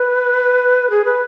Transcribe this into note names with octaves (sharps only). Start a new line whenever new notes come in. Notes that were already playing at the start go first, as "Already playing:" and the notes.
Already playing: B4
G#4
B4